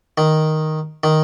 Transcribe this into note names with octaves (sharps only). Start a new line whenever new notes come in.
D#3
D#3